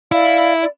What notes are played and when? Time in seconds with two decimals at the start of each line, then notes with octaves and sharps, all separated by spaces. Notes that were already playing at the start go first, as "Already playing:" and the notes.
0.12 E4 D5 F5
0.60 D5